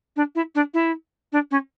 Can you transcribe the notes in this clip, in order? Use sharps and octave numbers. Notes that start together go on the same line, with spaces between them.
D4
E4
D4
E4
D4
C#4